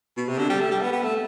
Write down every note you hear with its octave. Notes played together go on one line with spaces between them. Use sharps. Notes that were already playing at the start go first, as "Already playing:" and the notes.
B2
C3
D3
G3
A3
G3
B3
B3
A3